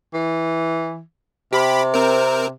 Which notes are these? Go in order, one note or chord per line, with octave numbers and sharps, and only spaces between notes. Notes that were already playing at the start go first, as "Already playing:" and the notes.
E3
C3 G4 B5
C4 A#4